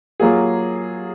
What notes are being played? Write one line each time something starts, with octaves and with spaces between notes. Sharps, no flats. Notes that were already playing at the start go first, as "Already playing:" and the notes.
F#3 A#3 F4 G#4